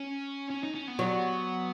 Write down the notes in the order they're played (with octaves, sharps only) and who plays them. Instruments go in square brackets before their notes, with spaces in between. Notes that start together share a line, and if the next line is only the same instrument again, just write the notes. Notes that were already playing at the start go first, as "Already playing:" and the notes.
Already playing: [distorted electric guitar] C#4
C#4
D#4
C#4
B3
[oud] F#3